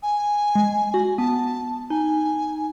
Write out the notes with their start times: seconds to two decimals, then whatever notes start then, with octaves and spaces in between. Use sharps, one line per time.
0.03 G#5
0.55 G#3
0.94 F#4
1.18 B3 A5
1.90 D#4 G#5